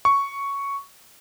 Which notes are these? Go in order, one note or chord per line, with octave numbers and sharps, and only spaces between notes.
C#6